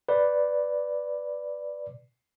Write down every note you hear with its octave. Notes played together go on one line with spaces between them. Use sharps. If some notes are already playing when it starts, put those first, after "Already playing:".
B4 D5